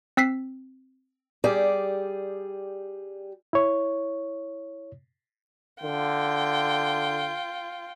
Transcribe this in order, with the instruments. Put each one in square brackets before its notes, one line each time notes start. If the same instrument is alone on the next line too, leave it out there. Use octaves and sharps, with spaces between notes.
[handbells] C4 E6 B6 C7
[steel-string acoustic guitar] G3 G4 G#4 D5
[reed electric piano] E4 C#5
[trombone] D3 [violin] F4 G5